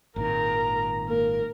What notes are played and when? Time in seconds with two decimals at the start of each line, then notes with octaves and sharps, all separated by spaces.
0.16 G#1 A#2 D#3 A#4 A#5
1.09 A#3 A#4